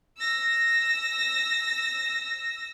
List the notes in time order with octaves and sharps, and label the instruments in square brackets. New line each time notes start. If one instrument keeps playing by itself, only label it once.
[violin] E6 A#6